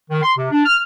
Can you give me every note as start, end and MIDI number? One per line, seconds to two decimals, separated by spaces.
0.11 0.21 51
0.23 0.32 84
0.37 0.48 48
0.52 0.65 62
0.66 0.80 89